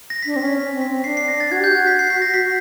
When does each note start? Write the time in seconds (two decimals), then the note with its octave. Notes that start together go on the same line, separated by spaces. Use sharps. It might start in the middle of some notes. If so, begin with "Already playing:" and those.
0.10 A#6
0.23 B6
0.26 D4
0.34 C4 A#6
0.42 C#4 B6
0.58 B6
0.73 C4
0.81 B6
0.90 C4
1.04 D4 C7
1.17 C7
1.28 A#6
1.40 A6
1.51 F#4 G#6
1.60 G4 G6
1.70 F#4
1.75 G#6
1.87 B6
1.99 C7
2.10 B6
2.22 A#6
2.34 B6